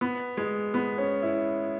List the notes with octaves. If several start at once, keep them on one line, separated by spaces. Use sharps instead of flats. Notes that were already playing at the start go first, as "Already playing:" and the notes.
B3
G#3
B3
C#4
E4